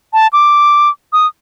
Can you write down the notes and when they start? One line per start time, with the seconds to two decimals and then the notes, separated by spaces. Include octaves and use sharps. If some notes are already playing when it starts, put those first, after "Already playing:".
0.13 A5
0.33 D6
1.13 D#6